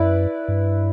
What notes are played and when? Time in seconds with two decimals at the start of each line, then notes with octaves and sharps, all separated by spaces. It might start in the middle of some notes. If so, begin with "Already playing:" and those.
Already playing: F#2 E4 B4 D5
0.48 G2